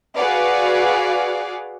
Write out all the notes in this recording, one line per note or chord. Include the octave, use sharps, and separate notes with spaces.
F#4 G#4 B4 D5 F5 F#5